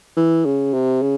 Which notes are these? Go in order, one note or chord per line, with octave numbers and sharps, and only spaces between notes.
E3
C#3
C3
C#3